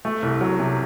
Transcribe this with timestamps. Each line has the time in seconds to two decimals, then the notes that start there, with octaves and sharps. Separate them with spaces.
0.05 A3
0.23 C2
0.41 F#3
0.59 C3